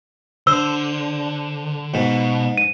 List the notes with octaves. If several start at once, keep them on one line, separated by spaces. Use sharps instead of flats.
D3 C5 E6
G#2 B2
D#7